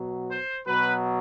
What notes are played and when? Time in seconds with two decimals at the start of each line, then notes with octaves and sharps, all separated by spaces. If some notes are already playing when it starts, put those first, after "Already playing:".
Already playing: B2 F#3
0.30 C5
0.67 B2 F#3 B4